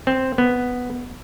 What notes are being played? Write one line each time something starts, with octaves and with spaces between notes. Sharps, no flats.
C4
B3